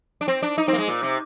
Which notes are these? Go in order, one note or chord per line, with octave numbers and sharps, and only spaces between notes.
D4
C4
D4
D#4
C4
A#3
G#3
A#2
C3